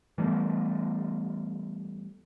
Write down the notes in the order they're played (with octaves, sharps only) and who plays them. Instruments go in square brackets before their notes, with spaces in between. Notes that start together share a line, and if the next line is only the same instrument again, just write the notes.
[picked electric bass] E3 G3 A3 B3